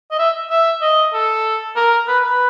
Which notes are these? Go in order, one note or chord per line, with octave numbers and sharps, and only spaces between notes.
D#5
E5
E5
D#5
A4
A#4
B4
B4